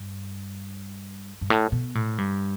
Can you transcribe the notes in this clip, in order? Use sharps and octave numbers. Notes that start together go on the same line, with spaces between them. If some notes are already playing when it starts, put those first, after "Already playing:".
Already playing: G2
G2
A2
B2
A2
G2